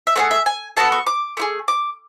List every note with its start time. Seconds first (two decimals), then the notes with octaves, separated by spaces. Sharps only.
0.07 E5
0.16 A3 D4 G#4 F#5
0.31 E5
0.46 G#5
0.77 B3 F#4 A4 A5
0.92 C#6
1.07 D6
1.37 A3 E4 G#4
1.68 D6